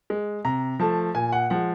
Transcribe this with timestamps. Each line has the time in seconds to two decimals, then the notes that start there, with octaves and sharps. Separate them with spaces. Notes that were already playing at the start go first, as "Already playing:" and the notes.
0.10 G#3
0.45 C3 A#5
0.80 F3 A3 A5
1.15 A#2 G#5
1.32 F#5
1.50 F3 G#3 F#5